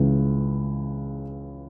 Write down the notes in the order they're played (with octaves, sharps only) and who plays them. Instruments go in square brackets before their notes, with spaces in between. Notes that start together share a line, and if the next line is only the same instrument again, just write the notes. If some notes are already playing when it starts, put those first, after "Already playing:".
Already playing: [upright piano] C#2 C#3 E3